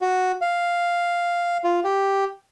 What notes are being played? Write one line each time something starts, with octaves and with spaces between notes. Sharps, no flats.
F#4
F5
F4
G4